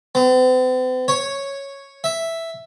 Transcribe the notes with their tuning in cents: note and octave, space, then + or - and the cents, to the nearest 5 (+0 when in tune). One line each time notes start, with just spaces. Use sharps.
C4 -45
C#5 -5
E5 +0